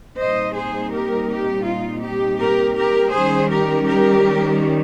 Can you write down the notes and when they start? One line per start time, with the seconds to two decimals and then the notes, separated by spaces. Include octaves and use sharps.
0.18 A#2 G3 C4 D#4 C5 D#5
0.54 G#4 C5
0.92 G4 A#4
1.29 G4
1.66 F4
2.03 G4
2.40 G4 A#4
2.76 G4 A#4
3.13 D#3 G3 C#4 G#4 C5
3.50 G4 A#4
3.87 G4 A#4